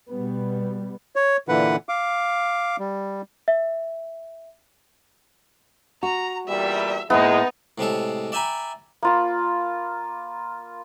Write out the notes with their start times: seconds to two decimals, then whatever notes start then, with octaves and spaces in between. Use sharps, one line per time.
0.10 B2 G3 B3
1.16 C#5
1.49 A#2 D3 E3 B4 F#5
1.89 F5 D6
2.79 G3
3.48 E5
6.03 F#4 A#5
6.47 E2 A#2 G3 E5
7.10 A2 G#3 A#3 B3 D#4 E4
7.78 A2 C3 G#3 A4
8.32 D5 E5 G5 G#5 A#5 B5
9.03 A#3 F4 B5